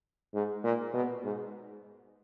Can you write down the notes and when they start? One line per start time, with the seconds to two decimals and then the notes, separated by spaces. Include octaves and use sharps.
0.34 G#2
0.64 A#2
0.94 B2
1.23 G#2